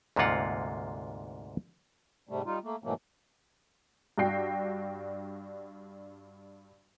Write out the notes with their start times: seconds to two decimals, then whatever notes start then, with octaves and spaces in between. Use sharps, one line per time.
0.16 D2 G#2 C3 A#3 F4 F#5
2.29 G#2 C3 G3 A3
2.46 G3 D#4 F4
2.64 A3 A#3
2.84 G#2 B2 E3 F#3 A3 A#3
4.18 G2 D4 F#4 G5 C7